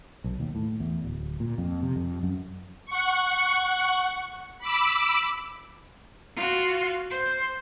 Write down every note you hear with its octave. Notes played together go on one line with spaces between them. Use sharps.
B1
D#2
A2
E2
D1
A#2
F2
C3
F2
F#2
F#5 C#6
B5 D6 E6
F4 F#4
C5